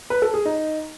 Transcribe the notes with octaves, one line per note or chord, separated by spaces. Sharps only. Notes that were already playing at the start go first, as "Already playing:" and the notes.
B4
A4
G#4
D#4